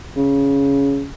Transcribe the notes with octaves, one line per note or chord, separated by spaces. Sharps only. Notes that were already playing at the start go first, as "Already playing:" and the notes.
C#3